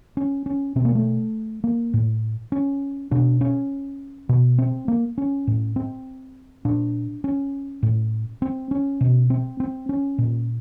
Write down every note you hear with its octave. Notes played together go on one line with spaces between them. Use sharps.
C#4
C#4
B2 C4
A#3
A3
A#3
A2
C#4
B2 D4
C#4
B2
C4
A#3
C#4
A2
C4
A#2 D4
C#4
A2
C4
C#4
B2
C4
C4
C#4
A#2